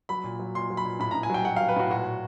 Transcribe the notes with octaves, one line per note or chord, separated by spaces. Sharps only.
F#3 B5
A#2
F#3
A#2 C6
F#3
B5
A#2
A2 B5
A2 A#5
G#5
F#3 G5
F#3 F#5
F#3 F5
B4
A2 F#4
A#2 F#4
A#2